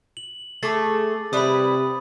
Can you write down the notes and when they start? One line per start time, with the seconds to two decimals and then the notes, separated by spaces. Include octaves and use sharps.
0.17 F#7
0.63 A3 G#4 A4 D6 A6
1.33 C3 G3 E4 B4 B5 D#6